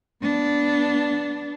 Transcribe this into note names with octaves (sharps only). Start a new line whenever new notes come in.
B3 D4